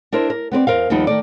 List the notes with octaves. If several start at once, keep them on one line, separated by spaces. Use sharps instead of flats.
D4 E4 A#4 C5
A#4
B3 C4 B4 D5
E2 G2 A#4 C5 F5
D#2 F3 G3 B3 D#4
D#3 A3 D5